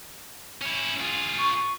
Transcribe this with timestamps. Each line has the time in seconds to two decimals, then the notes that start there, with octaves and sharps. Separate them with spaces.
0.62 C#4 E4
1.00 F4 G#4
1.37 C#6